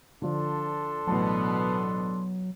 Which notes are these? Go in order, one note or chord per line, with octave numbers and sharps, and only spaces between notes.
D3 F3 D4 A4 C6
A1 B2 F#3 B3 A5